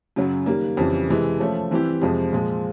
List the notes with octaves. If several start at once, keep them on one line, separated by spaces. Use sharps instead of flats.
F#2 C#3 F#3
D#3 G3 A#3
F2 C#3 E3 G3
C3 E3 G#3
F3 A3 C#4
E3 G3 C4 E4 G4
F2 C3 F3 G#3
A#2 F3 G#3